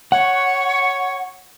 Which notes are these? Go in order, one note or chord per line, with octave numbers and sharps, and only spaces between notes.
C#5 F#5 C#6